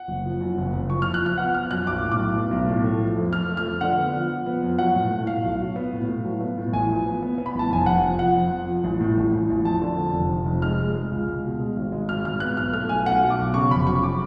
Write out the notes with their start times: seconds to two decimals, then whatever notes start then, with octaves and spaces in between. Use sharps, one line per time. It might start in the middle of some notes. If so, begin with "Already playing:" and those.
Already playing: F#5
0.08 F#1
0.25 F3
0.41 F#2
0.58 F#1
0.73 F#1
0.90 F3 C#6
1.02 F3 F6
1.14 F#6
1.22 F3 F6
1.38 B3 F#5
1.54 F3 F6
1.71 F#2 F#6
1.87 B1 D6
2.04 A2
2.12 D6
2.19 B1
2.36 B3
2.51 B1
2.69 A2
2.84 A3
3.00 F3
3.16 F2
3.32 F3 F6
3.49 A3
3.57 F6
3.65 F2
3.81 D3 F#5
3.98 B3
4.13 F3
4.30 F3
4.46 B3
4.63 F2
4.79 F#3 F#5
4.95 A2
5.11 A2
5.27 A2 F5
5.44 B1
5.60 F#3
5.76 B3
5.93 A2
6.08 A2
6.24 F#3
6.41 B3
6.58 A2
6.73 A1 G#5
6.89 F3
7.06 B3
7.23 B3
7.38 B3
7.46 B5
7.55 A1 A5
7.70 F1 G#5
7.86 F1 F#5
8.04 F2
8.19 F3 F#5
8.36 F2
8.51 F2
8.67 F3
8.84 A1
9.01 A2
9.17 A1
9.33 A1
9.50 A1
9.65 F2 A5
9.82 D3
9.98 F2
10.14 F1
10.30 F3
10.46 F1
10.62 G#3 F6
10.79 G#3
10.95 G#3
11.11 C#2
11.28 C#2
11.44 B2
11.60 G#3
11.76 G#1
11.92 G#3
12.08 G#1 F6
12.25 G#2 F6
12.40 B3 F#6
12.57 B1 F6
12.73 A3 F6
12.89 B1 G#5
13.06 B1 F#5
13.22 B2
13.30 D6
13.38 B1
13.54 C#3 C#6
13.71 F1 B5
13.87 F#3 C#6
14.03 F#3 D6